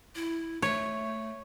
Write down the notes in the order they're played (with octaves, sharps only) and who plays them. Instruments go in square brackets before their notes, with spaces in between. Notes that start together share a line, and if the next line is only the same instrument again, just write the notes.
[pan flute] E4
[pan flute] A3 [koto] C#5